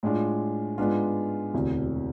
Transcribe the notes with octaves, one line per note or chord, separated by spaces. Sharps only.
A2 G#3 D4 F4
G#2 G#3 B3 D4 F4
E1 D2 C3 E3